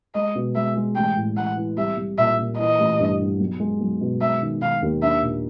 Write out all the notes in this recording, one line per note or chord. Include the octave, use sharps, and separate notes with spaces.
G#3 D#5
B2
G#3 E5
G#3
A1 G5
A2
A1 F#5
E3
C2 E5
C2
A#2 E5
A#2
E3 D#5
A1
G2
G2
B1
G#3
B1
B2
G#3 E5
D#3
D#3 F5
D#2
D4 E5
A#2